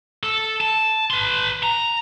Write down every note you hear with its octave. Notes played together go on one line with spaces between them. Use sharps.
A4
A5
B4 C6
A#5